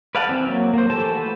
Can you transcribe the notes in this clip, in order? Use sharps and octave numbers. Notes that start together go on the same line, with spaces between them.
B4 D5 F5 F#5 A5
E3 C4
F#3 A#3
A#3 C5
E3 A3 G4 A4 A5
F#4 B4